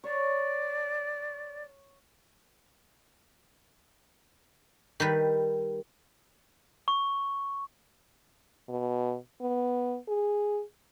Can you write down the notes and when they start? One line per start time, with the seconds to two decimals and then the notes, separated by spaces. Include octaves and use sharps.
0.04 C#5 D5
5.00 D#3 G3 B4
6.88 C#6
8.69 B2
9.41 B3
10.08 G#4